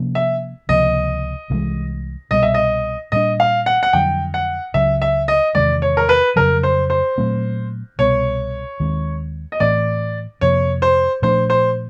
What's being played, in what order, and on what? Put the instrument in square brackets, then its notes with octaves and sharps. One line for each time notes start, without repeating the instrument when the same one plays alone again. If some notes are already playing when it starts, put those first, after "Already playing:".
Already playing: [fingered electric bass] C3 F3 A#3 C#4
[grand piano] E5
[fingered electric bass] C#2 C3 F3 A#3 [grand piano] D#5
[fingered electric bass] C2 C3 E3 G#3
[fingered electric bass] C2 B2 G3 B3 [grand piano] D#5
[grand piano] E5
D#5
[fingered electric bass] A#2 G3 A#3 D4 [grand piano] D#5
[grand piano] F5
F#5
F#5
[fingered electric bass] F2 D3 F#3 [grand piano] G5
[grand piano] F#5
[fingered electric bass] C#2 C#3 F#3 [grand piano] E5
[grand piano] E5
D#5
[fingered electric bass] E2 C3 D#3 G#3 [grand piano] D5
[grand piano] C#5
A#4
B4
[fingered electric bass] F2 C#3 F#3 [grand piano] A#4
[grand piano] C5
C5
[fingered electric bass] A#2 F#3 A3 C4
[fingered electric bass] C2 B2 G3 B3 [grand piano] C#5
[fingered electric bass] D#2 D#3 G#3 C4
[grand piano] D#5
[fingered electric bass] A2 E3 A3 C4 [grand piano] D5
[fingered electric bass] F2 C3 F3 A#3 [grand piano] C#5
[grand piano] C5
[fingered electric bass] A#2 F3 A3 D4 [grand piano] C5
[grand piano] C5